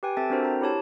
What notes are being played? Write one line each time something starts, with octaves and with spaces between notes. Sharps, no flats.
G4 B4 G5 G#5
C4 A4 E5 A5 A6
C4 D4 F#4 A4 A#4 C5
A#5
E4 G4 C#5 A5